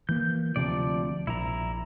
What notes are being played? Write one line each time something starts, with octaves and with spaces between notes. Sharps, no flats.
E3 A#3 G6
D2 C3 F3 D5
A#1 E4 A#5